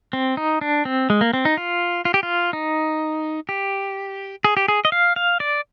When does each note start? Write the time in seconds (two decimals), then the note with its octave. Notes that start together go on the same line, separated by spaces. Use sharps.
0.13 C4
0.37 D#4
0.61 D4
0.85 C4
1.10 G#3
1.21 A#3
1.33 C4
1.45 D#4
1.57 F4
2.05 F4
2.14 G4
2.23 F4
2.53 D#4
3.49 G4
4.44 G#4
4.57 G4
4.68 G#4
4.85 D#5
4.92 F5
5.16 F5
5.40 D5